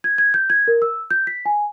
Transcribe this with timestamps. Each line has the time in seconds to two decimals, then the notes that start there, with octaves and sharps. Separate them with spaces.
0.04 G#6
0.18 G#6
0.34 G6
0.50 G#6
0.68 A#4
0.82 E6
1.11 G6
1.27 B6
1.46 G#5